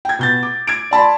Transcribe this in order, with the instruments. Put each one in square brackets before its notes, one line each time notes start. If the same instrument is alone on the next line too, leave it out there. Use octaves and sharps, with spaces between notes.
[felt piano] G5 G#6
B2 G6 A6
D6
G#6 D7
D5 A5 B5 C6